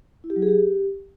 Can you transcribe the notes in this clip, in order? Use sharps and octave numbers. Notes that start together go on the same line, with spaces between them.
E4
G4
F#3
G#4
G4